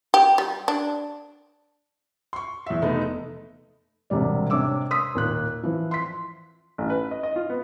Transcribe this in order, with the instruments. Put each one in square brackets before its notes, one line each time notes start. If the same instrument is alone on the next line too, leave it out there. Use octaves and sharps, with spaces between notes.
[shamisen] G4
G3
D4
[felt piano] C6 C#6
E2 E5
F1 A3 B3 D#4
E1 C3 G3 D5
C3 D4 C#5 D6 E6
C6 D#6 E6 B6
D#2 A#2 F#6
E3 F3
C6 B6
[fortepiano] A1
B4
D#5
D#5
F4
B3